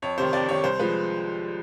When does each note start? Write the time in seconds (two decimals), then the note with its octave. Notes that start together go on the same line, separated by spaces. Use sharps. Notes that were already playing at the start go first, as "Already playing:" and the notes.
0.02 F2 C#5
0.18 C3 D#3 C5
0.33 F2 D5
0.49 C3 D#3 C#5
0.64 C2 C5
0.80 F3 G#3 B4